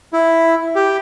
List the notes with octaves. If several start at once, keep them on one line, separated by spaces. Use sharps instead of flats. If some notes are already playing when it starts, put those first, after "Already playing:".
E4
G4